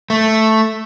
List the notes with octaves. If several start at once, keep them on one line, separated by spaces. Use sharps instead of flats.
A3